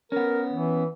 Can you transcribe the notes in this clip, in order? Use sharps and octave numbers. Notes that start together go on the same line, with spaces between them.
B3 C#4 A#4
E3